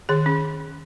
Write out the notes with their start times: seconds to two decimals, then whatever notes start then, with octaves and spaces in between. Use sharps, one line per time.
0.09 D#3 G#4
0.26 C#4